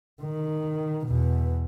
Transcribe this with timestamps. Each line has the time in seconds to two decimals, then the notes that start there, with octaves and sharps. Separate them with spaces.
0.22 D#3
1.06 E2 B2